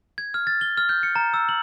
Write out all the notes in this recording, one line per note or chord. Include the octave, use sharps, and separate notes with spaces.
G#6
F6
A6
G7
F6
G6
C#7
A#5
E6
F#7